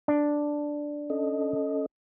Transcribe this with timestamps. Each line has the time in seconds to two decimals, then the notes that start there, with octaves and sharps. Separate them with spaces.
0.08 D4
1.10 C#4 A4 D#5